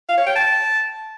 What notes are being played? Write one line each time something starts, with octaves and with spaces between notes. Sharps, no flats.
F5
C#5
G5
A5